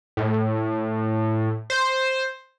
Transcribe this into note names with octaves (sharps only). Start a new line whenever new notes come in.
A2
C5